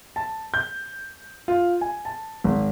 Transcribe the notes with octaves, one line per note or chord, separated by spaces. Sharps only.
A5
G6
F4
G#5
A5
G#1